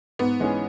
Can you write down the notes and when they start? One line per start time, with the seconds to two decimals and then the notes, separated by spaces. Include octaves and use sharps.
0.19 G#2 B3
0.40 E3 G#3 C#4 G#4